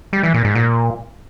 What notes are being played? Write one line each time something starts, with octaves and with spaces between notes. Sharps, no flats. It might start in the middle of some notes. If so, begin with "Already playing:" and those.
G3
E3
A#2
G#2
A#2